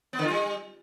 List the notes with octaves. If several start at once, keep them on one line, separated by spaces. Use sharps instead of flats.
B3
D3
F4
G3